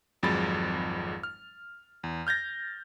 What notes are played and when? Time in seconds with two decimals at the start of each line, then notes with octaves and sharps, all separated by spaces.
0.23 G#1 F2 F#3 G#3 B5 A6
1.23 F6
2.04 E2
2.27 F6 G6 A6 A#6